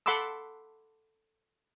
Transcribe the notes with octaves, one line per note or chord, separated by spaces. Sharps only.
A4 F#5 B5 C6 D6 E6